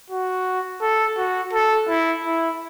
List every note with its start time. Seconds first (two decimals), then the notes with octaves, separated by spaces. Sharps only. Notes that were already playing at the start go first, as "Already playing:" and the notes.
0.10 F#4
0.81 A4
1.17 F#4
1.53 A4
1.88 E4
2.24 E4